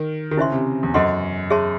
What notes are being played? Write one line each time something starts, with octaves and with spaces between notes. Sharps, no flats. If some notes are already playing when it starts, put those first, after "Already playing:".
Already playing: D#3
D#3
C#3 E4 C5 E5 C6
C3
E2
F#2 A4 C5 D#5 F#5 C6
G#4 C#5 E5 A5 C6